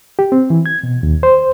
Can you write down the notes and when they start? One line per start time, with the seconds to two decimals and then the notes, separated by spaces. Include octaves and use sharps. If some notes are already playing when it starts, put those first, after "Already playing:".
0.19 G4
0.32 C4
0.50 E3
0.66 G#6
0.83 B2
1.03 D#2
1.23 C5